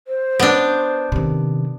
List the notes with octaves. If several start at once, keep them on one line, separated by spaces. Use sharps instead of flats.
C5
B3 D4
C3 D#3